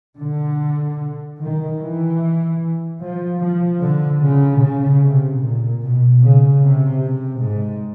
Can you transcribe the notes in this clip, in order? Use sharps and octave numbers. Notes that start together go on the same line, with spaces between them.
D3
D#3
E3
F3
F3
D3
C#3
C#3
C3
A#2
B2
C#3
C3
C3
G#2